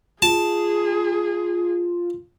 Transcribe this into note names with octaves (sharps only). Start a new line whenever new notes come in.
F4 G#4 A5